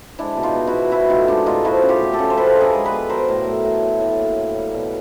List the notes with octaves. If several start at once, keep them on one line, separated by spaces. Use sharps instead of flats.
G#3 D4 E4
B2
D#4 F4
B3
E4 F#4
B2
E3 E4 F#4
A2 D#4 F4
G#3 D4 E4
A2 D#4 F4
F3 E4 F#4
C#3
F4 G4
A3
G4 A4
C#3
C5
F3 A4 B4
D3
G#4 A#4
G#3
A4 B4
B3
F#3 A#4 C5
A2
A3
A2
F#3
A2
A#3
A2
G3
B2